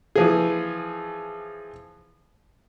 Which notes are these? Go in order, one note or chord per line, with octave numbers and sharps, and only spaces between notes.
E3 F3 G#4